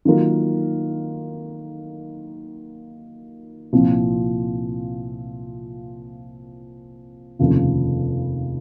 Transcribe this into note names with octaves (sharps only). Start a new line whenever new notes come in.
D#3 F#3 A#3 F4 A#4
C2 A#2 F3 C4
F1 D#2 C#3 F3